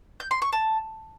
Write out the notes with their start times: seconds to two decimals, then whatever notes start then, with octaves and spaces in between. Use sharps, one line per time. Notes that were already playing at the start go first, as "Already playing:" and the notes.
0.20 G6
0.31 C6
0.42 C#6
0.53 A5